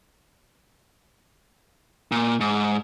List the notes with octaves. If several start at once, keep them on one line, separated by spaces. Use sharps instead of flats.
A#2
G#2